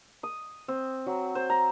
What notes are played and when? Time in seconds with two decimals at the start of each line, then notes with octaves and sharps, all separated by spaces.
0.23 D#6
0.68 C4
1.06 F#3
1.35 C5
1.50 A#5